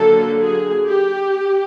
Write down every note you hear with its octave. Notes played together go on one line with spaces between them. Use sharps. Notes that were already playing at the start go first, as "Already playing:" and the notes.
Already playing: D3 F#3 A#3 A4
G#4
G4